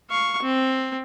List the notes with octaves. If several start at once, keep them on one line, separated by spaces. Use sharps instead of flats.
F5 C#6
C4